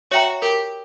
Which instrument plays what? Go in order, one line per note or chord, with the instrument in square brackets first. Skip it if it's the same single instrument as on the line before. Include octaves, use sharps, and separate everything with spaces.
[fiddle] F#4 [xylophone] C#5 E5 G5 A#5
[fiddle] G4 [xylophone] A#4